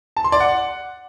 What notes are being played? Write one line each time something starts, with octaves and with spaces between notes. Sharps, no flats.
A5
C6
D5
F#5